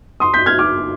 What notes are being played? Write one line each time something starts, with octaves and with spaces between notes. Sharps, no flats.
C6 D#6
G6 B6
F6 G#6
D6 F6